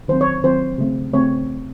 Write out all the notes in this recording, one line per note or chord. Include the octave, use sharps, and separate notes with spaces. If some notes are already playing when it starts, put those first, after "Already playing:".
D#3 F#3 C4 C5
C#5
D#3 F#3 C4 C5
C#3 A3 C4
C#3 A3 C4 C#5